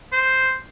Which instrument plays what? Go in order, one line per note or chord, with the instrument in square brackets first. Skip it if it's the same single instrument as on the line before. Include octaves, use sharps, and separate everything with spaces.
[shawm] C5